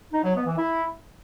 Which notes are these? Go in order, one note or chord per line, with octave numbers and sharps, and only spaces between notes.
D#4
F#3
B3
E3
E4